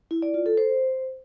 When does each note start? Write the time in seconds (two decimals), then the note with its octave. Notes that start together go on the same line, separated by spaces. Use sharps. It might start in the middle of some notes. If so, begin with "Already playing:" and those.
0.11 E4
0.22 D5
0.34 F4
0.46 A4
0.57 C5